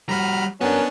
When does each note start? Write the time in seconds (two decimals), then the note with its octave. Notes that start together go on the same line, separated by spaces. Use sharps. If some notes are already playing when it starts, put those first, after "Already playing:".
0.09 G3 F#4 A#5 B5 F6
0.61 B3 C#4 D4 F#4 A#4